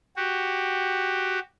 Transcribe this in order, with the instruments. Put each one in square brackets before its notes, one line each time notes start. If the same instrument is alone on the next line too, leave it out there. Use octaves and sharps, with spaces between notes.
[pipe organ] F#4 G4